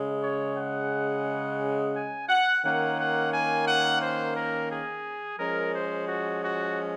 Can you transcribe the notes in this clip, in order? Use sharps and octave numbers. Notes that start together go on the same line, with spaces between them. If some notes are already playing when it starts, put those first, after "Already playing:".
Already playing: C#3 G#3 C#4
C#5
F#5
G#5
F#5
D#3 A#3 C#4 F#5
F#5
G#5
F#5
C5
A#4
G#4
F3 G#3 C#4 A#4
C5
F#4
F#4